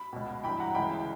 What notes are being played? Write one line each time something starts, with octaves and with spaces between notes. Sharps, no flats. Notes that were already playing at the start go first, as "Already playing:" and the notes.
Already playing: B5
C#2 B2
G2 E3 G5 B5
F#5 A#5
C#2 C#3 E3 G5 B5